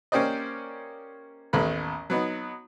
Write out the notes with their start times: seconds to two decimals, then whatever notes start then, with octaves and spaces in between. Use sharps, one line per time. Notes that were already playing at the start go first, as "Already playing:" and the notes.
0.12 A#3 C#4 G4 C5 D5 D#5
1.53 A1 D#2 A3 B3 B5
2.10 F#3 B3 D#4